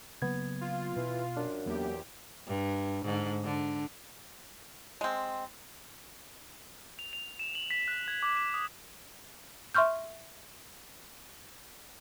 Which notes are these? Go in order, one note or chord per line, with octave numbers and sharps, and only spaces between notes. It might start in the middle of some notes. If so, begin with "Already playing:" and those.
C#3 F#3 A#3 B3 G#6
F4
B2 E3
F#2 D4
E2 F#3 A#3 G4
G2
G#2 D3
D3
G#3 C4
F7
F7
E7
F#7
B6
F#6
G#6
D6
E7
D#6
E5 C6 C#6 F6 G6